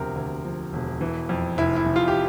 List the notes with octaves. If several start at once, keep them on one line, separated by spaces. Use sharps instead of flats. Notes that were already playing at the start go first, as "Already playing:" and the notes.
Already playing: E1 D2 C3 F3 A#4
D2
F3
E1
E3
F2
F1 E4
E4
F1
F4
G4